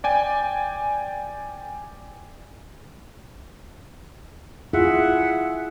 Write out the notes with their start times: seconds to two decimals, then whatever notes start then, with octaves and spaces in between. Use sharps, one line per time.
0.04 D5 G5 G#5
4.73 E4 F4 G#4 E5 F#5